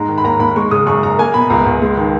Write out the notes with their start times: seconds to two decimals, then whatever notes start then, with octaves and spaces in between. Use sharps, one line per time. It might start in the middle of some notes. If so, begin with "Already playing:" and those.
Already playing: G#2 G#3 A#5
0.09 D#3
0.18 B5
0.24 D#2 A#5
0.39 D#2 B5
0.56 G#3 C#6
0.71 C#3 D#6
0.87 F#2 C#6
1.03 F#2 A#5
1.18 A#3 G#5
1.34 B2 B5
1.50 C#2 A#5
1.66 C#2
1.82 G#3
1.97 D#3